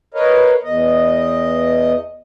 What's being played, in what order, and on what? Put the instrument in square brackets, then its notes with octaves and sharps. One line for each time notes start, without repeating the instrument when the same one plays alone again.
[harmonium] A#4 B4 C#5 D#5 F5
E2 D#5